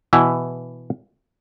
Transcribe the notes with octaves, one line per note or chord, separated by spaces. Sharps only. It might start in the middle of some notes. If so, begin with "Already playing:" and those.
B2 E3 E4